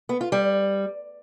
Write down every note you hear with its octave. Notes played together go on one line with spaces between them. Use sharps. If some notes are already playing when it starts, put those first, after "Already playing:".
B3
F4
G3